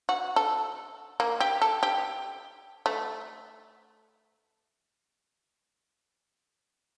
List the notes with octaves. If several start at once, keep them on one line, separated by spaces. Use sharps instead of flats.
F#4
A4
A#3
G4
A4
G4
A3